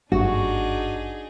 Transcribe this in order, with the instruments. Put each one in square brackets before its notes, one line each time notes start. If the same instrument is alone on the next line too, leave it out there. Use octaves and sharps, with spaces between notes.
[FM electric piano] G#1 G2 [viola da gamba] D4 D#4 G#4 [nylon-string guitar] F#4